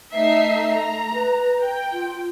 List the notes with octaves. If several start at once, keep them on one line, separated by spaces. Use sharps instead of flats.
A3 D#4 E5 C7
A#5
B4
G5
F4